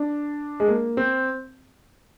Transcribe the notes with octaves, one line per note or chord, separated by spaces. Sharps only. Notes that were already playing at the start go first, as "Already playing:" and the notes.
Already playing: D4
G#3
A#3
C4